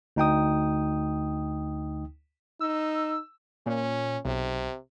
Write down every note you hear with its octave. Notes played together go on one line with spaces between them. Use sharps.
D2 D#4 G5 D#6
D#4 E6
A#2 C#4
B1 C3